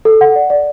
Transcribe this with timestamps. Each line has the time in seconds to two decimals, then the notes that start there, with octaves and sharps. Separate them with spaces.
0.05 A4
0.21 F#5
0.36 D5
0.50 D5